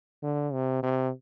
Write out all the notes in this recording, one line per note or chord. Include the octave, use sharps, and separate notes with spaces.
D3
C3
C3